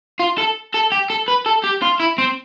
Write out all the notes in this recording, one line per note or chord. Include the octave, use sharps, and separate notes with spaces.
F4
A4
A4
G4
A4
B4
A4
G4
F4
E4
C4